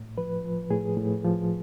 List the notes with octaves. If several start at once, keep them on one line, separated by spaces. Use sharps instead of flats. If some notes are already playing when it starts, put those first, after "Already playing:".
Already playing: A2
F3 B4
F3
A2 G#4
A2
F3